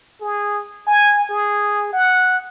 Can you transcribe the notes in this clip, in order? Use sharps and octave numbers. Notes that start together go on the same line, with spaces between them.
G#4
G#5
G#4
F#5